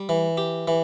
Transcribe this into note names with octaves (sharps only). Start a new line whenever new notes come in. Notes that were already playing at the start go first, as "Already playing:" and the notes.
Already playing: G3
E3
G4
E3